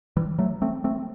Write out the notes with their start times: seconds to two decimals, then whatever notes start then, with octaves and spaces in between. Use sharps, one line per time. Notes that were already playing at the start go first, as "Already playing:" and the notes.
0.17 E3 G3
0.39 F#3 A3
0.62 A3 C4
0.84 A3 C4